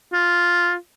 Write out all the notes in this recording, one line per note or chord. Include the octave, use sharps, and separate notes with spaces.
F4